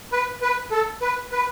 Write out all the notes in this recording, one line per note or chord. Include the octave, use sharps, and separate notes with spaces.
B4
B4
A4
B4
B4